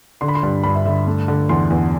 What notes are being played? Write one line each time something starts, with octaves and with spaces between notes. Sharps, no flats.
D3 C6
B5
C6
G2
G2 B5
E5
D3 E5
A3
D3
E2 C6
E2